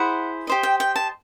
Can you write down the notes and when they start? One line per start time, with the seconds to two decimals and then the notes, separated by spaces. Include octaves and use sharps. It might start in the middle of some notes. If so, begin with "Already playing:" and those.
Already playing: E4 G#4 C5 F#5
0.47 G4 C5 D#5
0.63 G5
0.80 G5
0.96 A5